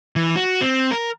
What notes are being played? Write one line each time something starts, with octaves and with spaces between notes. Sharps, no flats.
E3
F#4
C4
A#4